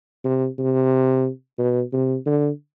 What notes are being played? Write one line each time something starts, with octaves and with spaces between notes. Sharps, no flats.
C3
C3
B2
C3
D3